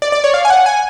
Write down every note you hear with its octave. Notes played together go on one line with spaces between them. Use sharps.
D5
D5
C#5
F5
G#5
F#5
G#5